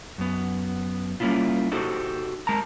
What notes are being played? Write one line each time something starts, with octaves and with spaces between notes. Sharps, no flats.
F#2 B3
G3 A#3 B3 C#4 E4 F4
D#4 F#4 G4 A4 C5
G#3 A#4 A5 A#5